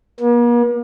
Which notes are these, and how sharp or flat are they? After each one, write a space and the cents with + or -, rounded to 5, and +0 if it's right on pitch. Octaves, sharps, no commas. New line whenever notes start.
A#3 +45